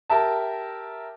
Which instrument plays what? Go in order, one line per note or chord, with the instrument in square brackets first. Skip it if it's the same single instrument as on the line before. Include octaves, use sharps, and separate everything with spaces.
[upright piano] G4 A#4 E5 A5